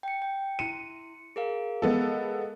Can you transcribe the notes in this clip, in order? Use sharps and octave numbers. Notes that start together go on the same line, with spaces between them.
G5 C#7
G5
E4 C6 C#7 D#7
G#4 A#4 F5
G#3 B3 A4